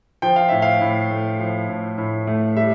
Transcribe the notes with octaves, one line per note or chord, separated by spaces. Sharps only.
F3 G5
F5
A2 E5
F5
A2
A3
F3
A2
A2
A3
G3 E5